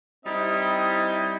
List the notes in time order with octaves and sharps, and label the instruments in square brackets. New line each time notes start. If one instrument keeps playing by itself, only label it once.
[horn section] G3 C4 D#4 E4 D#5